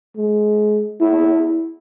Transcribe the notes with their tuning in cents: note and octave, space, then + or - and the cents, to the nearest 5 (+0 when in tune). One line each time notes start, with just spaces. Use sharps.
G#3 +25
E4 -10